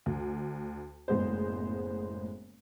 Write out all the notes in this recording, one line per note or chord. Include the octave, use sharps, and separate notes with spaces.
D2
F#1 A2 G#3 B3 G#4 C5